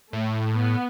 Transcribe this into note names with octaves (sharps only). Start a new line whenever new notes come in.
A2 A3
B3